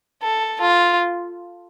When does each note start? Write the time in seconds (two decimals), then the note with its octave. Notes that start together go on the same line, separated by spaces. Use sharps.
0.22 A4
0.61 F4